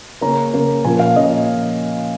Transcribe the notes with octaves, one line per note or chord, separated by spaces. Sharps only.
C#3 A#3 C#4 A#5
C#3 A#3 C#4
A#2 F3 A#3 C#4 G#5
F5
A#2 F3 A#3 C#4 D#5